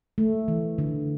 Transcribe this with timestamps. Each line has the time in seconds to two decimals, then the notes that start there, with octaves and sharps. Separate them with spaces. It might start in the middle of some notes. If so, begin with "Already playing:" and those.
0.18 A3
0.48 E3
0.78 D3